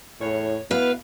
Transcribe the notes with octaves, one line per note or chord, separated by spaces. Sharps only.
E2 A2 C#5
B2 B3 E4 B4 F5